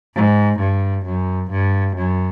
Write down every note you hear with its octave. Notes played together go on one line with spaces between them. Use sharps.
G#2
G2
F#2
G2
F#2